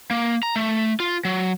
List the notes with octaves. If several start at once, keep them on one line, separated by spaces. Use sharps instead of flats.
A#3
A#5
A3
F4
F#3